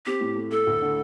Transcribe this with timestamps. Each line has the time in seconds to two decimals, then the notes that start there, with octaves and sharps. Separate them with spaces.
0.06 C4 G4
0.21 A2
0.36 A3
0.51 A3 A4
0.67 D2
0.82 D3